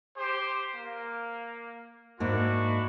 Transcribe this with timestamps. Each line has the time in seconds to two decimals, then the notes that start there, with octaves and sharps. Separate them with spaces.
0.16 G4 C5
0.75 A#3
2.20 G#2 A#3 D4 E4 F#4